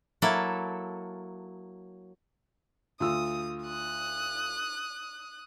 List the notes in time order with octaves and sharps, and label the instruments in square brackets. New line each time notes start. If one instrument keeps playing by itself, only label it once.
[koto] F#3 A#3 E4 A4
[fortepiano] D2 F4 E6 [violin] D#6
[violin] D#6 F#6